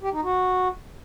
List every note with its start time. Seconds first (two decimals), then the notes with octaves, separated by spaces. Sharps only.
0.02 G4
0.13 D#4
0.24 F#4